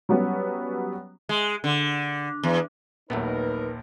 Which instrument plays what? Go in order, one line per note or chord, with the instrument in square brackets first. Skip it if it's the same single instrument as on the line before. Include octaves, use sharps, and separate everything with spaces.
[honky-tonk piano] F#3 G3 B3 C#4
[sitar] G#3
D3
E2
[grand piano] A#1 D#2 [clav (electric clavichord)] F#3 A3 B3 [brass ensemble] D#4 A#4 [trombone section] B4